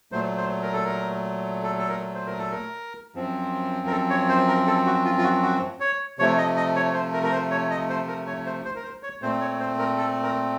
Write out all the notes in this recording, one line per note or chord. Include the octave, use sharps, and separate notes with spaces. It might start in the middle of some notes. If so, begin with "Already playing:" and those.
A#2 F#3 A3 C5
C5
A#4
A4
A#4
A4
A4
A#4
C5
A#4
A4
A#4
F#2 F3 C4
A#4
A4
C#5
C5
A#4
A4
F#4
F4
F4
F#4
F#4
C#5
C3 F3 A3 C#5
D#5
D#5
C#5
C5
A#4
A#4
C5
C#5
D#5
C5
A#4
C#5
C5
C5
A#4
C5
C#5
A#2 A3 C4 C5
C#5
C5
A#4
A4
A#4